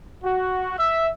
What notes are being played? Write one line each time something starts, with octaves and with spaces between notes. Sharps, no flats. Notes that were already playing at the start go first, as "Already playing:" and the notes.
F#4
E5